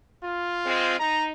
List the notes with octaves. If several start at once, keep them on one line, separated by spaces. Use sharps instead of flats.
F4
G#3 C4
D#4 A#5